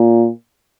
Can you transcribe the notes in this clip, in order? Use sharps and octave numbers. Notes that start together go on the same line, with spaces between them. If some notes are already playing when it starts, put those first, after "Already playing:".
Already playing: A#2